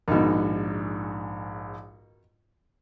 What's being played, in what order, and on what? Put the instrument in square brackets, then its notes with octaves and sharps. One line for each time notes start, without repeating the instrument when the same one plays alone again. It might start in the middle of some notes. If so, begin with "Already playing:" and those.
[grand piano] A#1 G#2 [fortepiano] B2 D#3